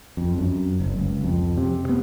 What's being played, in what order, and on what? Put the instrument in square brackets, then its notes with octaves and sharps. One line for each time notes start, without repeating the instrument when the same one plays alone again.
[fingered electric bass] F2
F#2
F#1
C#2
F2
C3
B3